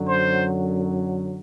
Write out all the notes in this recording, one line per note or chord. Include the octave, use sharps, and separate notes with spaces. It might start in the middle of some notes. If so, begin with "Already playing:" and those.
Already playing: F#2 D3 F#3
C5